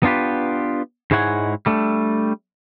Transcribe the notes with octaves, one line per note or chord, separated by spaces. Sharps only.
B3 D4 F4 G4 B4
G#2 G#3 E4 C#5 F#5 G#5
G3 A3 D4